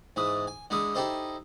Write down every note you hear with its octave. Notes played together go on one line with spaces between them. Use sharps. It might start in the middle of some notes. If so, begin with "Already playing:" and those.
G#2 E3 E4 D#6
G#5
D3 G#3 E4 D#6
D#4 E4 G4 A4 C5 D#5